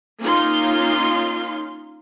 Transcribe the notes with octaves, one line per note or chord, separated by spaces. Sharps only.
A#3 C#4 D#4 F4 F5 C6